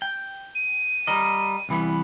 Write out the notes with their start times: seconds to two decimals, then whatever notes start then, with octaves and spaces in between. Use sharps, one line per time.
0.02 G5
0.55 D#7
1.07 G3 A#4 D#5
1.69 C2 E3 B3